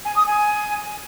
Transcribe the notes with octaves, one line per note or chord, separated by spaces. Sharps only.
G#5
D#6
G#5